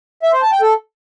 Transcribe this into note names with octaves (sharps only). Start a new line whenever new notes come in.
E5
C5
A5
G5
A4